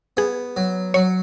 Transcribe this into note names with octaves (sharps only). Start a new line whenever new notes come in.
B3 G#4
F#3
F#3 C#5